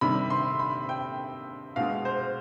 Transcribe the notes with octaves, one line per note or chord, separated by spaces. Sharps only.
C3 D#3 G3 B5
C6
B5
G5
B2 G#3 F5
C5